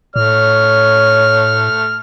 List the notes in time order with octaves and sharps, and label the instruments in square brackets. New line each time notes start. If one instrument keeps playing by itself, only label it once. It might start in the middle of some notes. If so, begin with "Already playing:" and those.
[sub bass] A2 [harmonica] A3 F6 [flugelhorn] C#5